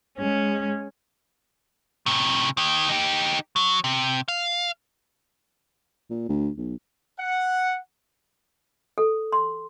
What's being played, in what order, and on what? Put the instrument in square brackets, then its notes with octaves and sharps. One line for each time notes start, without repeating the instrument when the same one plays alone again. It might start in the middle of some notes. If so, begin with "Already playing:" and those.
[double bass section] G#3 [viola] C#4
[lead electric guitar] A2 C3
D#3 G4
D#4 G4
F#3
C3
F5
[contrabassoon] A#2
D2
B1
[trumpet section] F#5
[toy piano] A4
C6